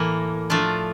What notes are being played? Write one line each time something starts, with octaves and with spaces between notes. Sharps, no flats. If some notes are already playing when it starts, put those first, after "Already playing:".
Already playing: A2 E3 A#3
F3 A3 D4 F4